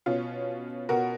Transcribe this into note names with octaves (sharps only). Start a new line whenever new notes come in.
B2 C#4 F4
B2 F#4 A#4